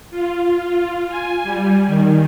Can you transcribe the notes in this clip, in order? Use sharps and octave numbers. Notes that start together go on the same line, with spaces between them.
F4
F4
G#5
G3
D#3